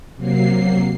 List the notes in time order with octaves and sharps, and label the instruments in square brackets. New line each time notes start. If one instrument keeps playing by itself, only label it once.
[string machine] C3 F#3 A#3 C7